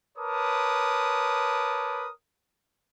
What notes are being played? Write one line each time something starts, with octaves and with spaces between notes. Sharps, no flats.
A#4 B4 C#5 A5 D6 D#6